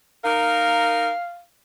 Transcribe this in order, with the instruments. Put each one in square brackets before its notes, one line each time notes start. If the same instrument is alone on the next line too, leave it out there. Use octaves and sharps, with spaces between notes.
[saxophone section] D#4 A#4 [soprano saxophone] F5